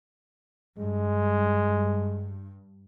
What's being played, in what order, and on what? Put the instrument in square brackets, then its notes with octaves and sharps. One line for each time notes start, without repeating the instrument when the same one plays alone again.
[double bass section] G2 [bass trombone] G#3